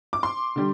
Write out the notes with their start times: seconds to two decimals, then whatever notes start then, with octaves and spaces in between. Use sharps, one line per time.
0.13 D6
0.23 C6
0.56 D3 G3